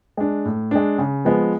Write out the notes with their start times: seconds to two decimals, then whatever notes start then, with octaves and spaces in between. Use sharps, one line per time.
0.17 G#3 D4
0.45 A2
0.71 G#3 D4
0.98 C#3
1.25 F3 G#3 B3